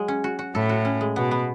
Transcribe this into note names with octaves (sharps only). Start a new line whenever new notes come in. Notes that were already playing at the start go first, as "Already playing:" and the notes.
Already playing: F#3 G#3
C#4
F#4
F#4
A2 A4
F#4
C#4
G#3
B2 B3
B3